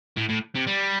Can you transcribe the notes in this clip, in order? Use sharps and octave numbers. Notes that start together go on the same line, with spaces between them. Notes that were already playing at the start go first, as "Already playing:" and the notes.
A2
A2
C3
G3